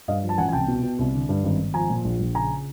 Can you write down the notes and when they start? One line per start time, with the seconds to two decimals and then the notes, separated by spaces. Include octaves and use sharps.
0.08 G2 D#5 F5
0.23 F3
0.29 A5
0.38 A1 F#5 G#5
0.48 G#5
0.53 C2 G5 A5
0.68 B2
0.83 B2
0.99 C2
1.14 D3
1.29 G2
1.44 G#1
1.59 G#1
1.74 F3 G#5 A#5
1.90 A#2
2.04 A#1
2.20 A#1
2.35 C#3 G#5 A#5